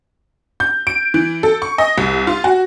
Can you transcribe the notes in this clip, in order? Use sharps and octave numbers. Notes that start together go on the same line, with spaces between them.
G6
D7
E3
A4
C#6
D#5
C2
F4
F#4